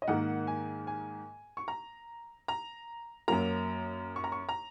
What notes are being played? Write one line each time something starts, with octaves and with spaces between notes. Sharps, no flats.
D#5
G#2 D#3 A#3 F#5
G#5
G#5
C#6
A#5
A#5
F#2 F#3 A#3 A#5
C#6
A#5
C#6
A#5